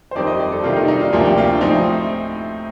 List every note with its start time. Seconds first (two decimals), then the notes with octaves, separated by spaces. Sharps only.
0.11 C5
0.15 F2 D#3 G3 C4 D5
0.27 D#5
0.40 D5
0.52 A4
0.64 C3 D#3 G3 F4
0.76 D#4
0.84 D4
0.88 D#4
1.00 F4
1.13 D2 C3 F3 A#3 D4 G4
1.25 G4
1.38 F4
1.49 D4
1.61 A2 F3 C4 D#4